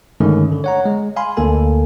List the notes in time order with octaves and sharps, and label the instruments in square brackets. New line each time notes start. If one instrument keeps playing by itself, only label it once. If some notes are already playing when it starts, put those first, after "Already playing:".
[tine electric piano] G2 D3 D#3 G#3 A3 C#4
D3
C#5 F#5 A#5
G#3
F5 G#5 B5 C6
D2 D3 A#3 A4 G#5